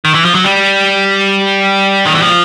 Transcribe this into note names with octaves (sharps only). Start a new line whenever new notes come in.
D#3
E3
F3
F#3
G3
D#3
E3
F3